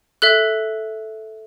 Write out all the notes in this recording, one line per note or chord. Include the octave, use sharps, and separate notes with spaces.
A4 E5 F#6